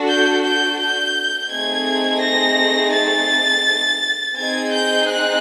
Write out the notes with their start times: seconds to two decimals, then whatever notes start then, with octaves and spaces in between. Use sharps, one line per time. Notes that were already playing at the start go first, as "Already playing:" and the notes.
Already playing: D4 F#4 A4
0.09 G6
0.44 G6
0.80 G6
1.51 A3 C4 D#4 G#4 G#6
2.23 A#6
2.94 A6
4.37 C4 D#4 G#4 G#6
4.72 G6
5.08 F#6